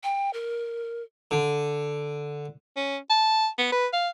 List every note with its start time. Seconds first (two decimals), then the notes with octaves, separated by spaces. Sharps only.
0.04 G5
0.33 A#4
1.31 D3
2.76 C#4
3.10 A5
3.58 B3
3.72 B4
3.93 F5